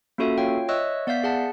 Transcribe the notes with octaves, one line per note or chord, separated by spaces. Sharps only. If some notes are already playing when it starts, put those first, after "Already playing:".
A#3 C#4 F4 F#4 A4 E5
F4 C#5 F5 G5
C#5 D#5 E5 C#6 E6 F#6
B3 D5 E5 F5 G6 B6
G#4 F#5 A5